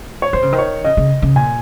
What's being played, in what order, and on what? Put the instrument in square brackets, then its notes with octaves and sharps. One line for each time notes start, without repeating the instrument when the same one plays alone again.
[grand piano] C#5
[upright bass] D#3 [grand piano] C5
[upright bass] C#3
D#3
[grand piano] C#5
[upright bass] C#3 [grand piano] D#5
[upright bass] C#3
C#3
[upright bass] A#2 [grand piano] G#5